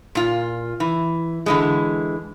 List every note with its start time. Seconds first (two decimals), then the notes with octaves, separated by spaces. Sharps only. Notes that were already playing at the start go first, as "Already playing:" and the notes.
0.15 A#2 F4
0.80 E3
1.46 D3 E3 G#3